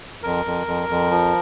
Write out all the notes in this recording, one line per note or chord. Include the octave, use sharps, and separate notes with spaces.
F2 A#4
F2
F2
F2
F3